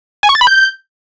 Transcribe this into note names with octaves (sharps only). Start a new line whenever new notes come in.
G#5
C#6
A6
B5
G6